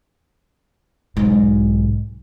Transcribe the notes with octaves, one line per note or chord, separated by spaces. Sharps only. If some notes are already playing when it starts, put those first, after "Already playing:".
B1 G#2